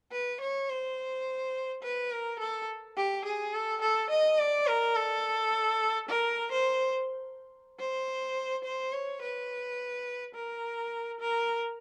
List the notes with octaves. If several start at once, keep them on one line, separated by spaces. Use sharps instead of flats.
B4
C#5
C5
B4
A#4
A4
G4
G#4
A4
A4
D#5
D5
A#4
A4
A#4
C5
C5
C5
C#5
B4
A#4
A#4